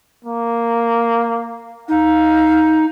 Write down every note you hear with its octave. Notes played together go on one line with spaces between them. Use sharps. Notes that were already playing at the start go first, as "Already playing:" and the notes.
A#3
D#4 F5